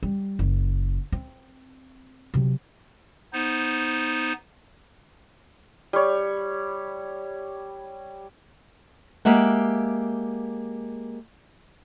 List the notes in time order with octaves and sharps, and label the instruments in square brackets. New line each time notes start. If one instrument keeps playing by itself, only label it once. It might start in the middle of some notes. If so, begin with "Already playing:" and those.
[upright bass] G3
F#1
C4
C3 F#3
[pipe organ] B3 D#4 C5
[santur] G3 C#5
[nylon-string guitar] G#3 A#3 G4 E5 F#5